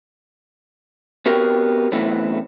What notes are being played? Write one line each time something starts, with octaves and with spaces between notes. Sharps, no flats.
B3 C4 F#4 G4 A#4
F#2 A2 E3 A3 B3 C4